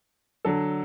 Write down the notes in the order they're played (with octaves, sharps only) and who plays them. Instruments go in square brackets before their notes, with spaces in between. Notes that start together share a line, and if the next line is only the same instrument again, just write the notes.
[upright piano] D3 F#3 D4 A4